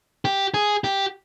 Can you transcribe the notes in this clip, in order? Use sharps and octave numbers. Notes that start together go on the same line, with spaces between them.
G4
G#4
G4